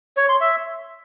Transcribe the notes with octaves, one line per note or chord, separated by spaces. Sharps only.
C#5
C6
E5